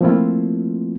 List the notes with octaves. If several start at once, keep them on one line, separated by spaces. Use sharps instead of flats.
F3 A3 A#3 C4 E4 F4